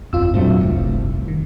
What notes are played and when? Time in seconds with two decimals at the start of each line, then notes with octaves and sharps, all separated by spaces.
0.13 G1 F2 F4 E6
0.34 G2 A#2 F#3 A3 C4
0.61 F1 C2 G2
1.28 D#3